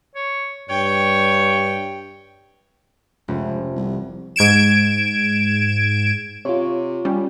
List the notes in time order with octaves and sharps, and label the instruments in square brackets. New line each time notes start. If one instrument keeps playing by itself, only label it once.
[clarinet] C#5
[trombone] G2 [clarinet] C#5 [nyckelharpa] G5
[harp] F1 [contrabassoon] C#2
[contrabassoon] C2
[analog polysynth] G#2 G#6 D7 E7
[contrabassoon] C3 [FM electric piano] F4 C#5
[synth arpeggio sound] G3 C#4